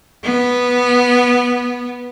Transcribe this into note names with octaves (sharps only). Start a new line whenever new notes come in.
B3